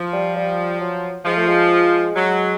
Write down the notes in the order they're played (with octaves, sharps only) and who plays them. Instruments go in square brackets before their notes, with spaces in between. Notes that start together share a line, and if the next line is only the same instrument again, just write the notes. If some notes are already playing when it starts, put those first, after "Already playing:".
Already playing: [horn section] F3
[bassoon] G3
G3
F#3
[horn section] F3 [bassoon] G#3
[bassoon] A3
G#3
[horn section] F#3